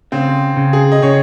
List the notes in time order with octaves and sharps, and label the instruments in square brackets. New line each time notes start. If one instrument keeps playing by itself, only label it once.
[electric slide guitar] C#3 [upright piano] C4
[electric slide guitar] C#3
[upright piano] G#4
D#5
[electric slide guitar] C#3 [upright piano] C#5